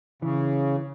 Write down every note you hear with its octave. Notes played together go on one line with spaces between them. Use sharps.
C#3 E3